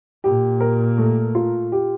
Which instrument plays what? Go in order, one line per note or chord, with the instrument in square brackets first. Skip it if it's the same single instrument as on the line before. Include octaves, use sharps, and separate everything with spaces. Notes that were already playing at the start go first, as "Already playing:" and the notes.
[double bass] A#2 [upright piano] G4
[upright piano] A#4
A3
F4
G4